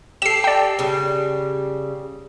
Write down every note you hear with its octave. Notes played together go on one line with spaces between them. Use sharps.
G4 A4 C7 E7
D5 G5
C#3 G3